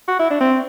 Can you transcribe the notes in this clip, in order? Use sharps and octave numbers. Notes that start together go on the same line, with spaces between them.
F#4
E4
D4
C4